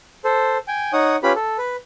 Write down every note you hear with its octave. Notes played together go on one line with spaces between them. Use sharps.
A4 C5
G5 G#5
D#4 C#5 F#5 D#6
C#4 F4 G4 B4 B5
A4
B4